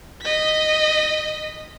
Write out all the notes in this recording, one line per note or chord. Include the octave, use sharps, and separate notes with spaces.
D#5 B6